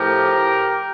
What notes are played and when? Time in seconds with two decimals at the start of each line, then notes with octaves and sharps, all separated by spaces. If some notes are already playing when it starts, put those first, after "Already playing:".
Already playing: A2 F3 G4 A#4